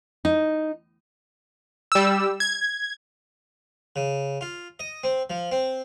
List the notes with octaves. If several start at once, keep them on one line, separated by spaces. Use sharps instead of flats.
D#4
G3 E6
G#6
C#3
F4
D#5
C4
F3
C4